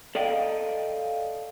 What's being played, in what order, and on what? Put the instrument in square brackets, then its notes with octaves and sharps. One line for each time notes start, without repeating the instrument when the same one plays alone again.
[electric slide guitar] A4 D5 D#5 F5 G5